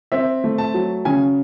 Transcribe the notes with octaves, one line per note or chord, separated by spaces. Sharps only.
C4 E5
A3
A5
F#3
C#3 G#5